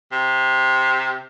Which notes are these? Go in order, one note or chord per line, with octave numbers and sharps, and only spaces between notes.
C3